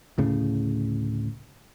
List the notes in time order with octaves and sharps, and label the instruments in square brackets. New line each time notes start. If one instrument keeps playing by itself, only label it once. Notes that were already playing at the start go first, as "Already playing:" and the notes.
[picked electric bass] D2 A2 C#3